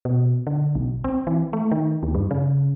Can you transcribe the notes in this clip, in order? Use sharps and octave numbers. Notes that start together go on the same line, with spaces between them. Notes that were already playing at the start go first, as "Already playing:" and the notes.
B2
D3
B1
C4
E3
A3
D#3
D#2
G2
C#3